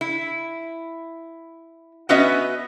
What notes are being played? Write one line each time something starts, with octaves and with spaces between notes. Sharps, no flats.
E4
B3 C#4 F#4 B4 D#5 E5